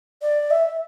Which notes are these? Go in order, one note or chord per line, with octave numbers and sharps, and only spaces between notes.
D5
E5